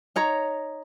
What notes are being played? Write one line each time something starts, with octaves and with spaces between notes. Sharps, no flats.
D#4 C#5 A#5